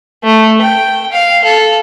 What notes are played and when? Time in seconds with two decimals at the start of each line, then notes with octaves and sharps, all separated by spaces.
0.23 A3
0.61 G5
1.12 F5
1.44 A4